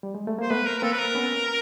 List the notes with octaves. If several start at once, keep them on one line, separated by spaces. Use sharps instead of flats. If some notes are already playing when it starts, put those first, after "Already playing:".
G3
G#3
A3
A#3 C5
A3 B3 B4
A#4
A#4
A#3 C4 A4
B4
A#4
B3 C#4